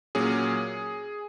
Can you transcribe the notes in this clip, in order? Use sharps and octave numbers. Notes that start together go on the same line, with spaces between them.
A#2 F#3 A#3 C#4 G#4